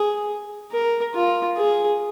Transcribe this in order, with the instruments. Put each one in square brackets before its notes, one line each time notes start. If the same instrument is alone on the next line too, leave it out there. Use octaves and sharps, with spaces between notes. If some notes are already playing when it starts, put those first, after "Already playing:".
Already playing: [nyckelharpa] G#4
A#4
F4
G#4